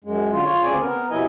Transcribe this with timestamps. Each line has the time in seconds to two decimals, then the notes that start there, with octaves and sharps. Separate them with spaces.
0.04 F#2 G#3
0.31 D3 F4
0.44 F4 C#5
0.63 D2 C#3 C4 G#4 D5 G#5
0.81 B3 A#4
1.11 C3 F#3 E4 D#5 G#5